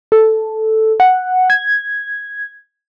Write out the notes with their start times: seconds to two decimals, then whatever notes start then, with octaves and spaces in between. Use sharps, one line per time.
0.12 A4
1.00 F#5
1.50 G#6